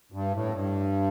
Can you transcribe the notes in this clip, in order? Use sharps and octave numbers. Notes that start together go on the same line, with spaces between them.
G2
A2
F#2
G2